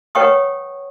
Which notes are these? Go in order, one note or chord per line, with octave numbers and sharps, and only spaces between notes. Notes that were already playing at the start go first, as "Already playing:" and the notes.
B4 C#5 F#5 G5 C#6 D#6